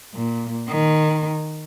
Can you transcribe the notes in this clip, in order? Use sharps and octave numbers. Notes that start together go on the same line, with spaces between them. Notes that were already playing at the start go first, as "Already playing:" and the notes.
A#2
D#3